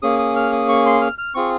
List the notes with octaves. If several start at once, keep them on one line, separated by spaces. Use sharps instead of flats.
A#3 C#4 G#4 D#6
D#6
F6
D#6
C#6
C6
F6
F6
C4 F4 G#4 C#6